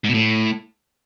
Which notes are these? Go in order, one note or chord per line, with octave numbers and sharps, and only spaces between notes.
G#2
B2
A2